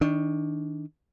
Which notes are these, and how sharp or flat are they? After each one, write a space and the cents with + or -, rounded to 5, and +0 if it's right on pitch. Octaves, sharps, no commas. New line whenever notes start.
D#3 +25 D4 +0